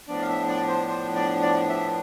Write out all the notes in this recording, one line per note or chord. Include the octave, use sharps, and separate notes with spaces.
A2 F3 B3 D4 D5
F5
E5
D5
C5
C5
D5
D5
E5